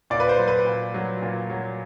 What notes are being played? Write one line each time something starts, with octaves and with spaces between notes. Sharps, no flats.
A#2 D5
B4
C5
F#3
B4
A#2
F#3
A#2
F#3